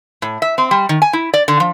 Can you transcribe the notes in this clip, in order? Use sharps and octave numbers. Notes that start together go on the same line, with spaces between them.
A2
E5
C4
G3
D#3
G#5
E4
D5
D3
F3